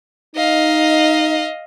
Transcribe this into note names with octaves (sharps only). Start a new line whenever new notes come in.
D#4 D#5 F5